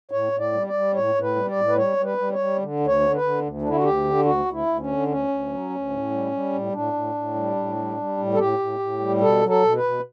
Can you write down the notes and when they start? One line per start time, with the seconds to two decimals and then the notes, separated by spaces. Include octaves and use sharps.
0.11 A2 C#5
0.32 A2
0.39 D5
0.53 G3
0.67 D5
0.73 G3
0.94 A2 C#5
1.15 A2
1.21 B4
1.36 G3
1.49 D5
1.56 A2
1.68 B4
1.76 G3 C#5
1.97 G3
2.04 B4
2.18 G3
2.32 C#5
2.39 G3
2.60 D3
2.80 D2
2.87 C#5
3.00 D3
3.15 B4
3.21 D3
3.42 D2
3.62 D3 D4
3.69 E4
3.76 F#4
3.83 D2 G4
4.04 D3
4.25 D2 F#4
4.45 D2
4.53 E4
4.66 D2
4.80 C#4
4.86 D3
5.08 D2 C#4
5.28 D2
5.49 F#3
5.70 D2
5.90 A2
6.11 G3
6.32 G3
6.52 A2
6.72 A2 D4
6.93 A2
7.14 A2
7.35 G3
7.56 A2
7.76 G3
7.97 G3
8.17 A2
8.34 A4
8.38 A2 G4
8.59 A2
8.79 A2
9.00 G3
9.21 B2 A4
9.41 F#3
9.49 A4
9.62 B2
9.76 B4
9.83 B2